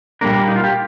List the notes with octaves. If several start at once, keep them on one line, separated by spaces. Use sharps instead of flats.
A#2 G3 A#3 D4 A#4
D#4
F4
G4